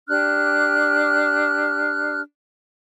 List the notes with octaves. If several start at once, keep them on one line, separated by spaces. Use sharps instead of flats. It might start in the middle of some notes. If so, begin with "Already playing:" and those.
D4 G4 F6 F#6